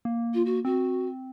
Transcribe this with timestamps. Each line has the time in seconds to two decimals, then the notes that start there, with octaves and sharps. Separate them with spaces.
0.05 A#3
0.34 F4
0.45 F#4
0.65 C4 F#4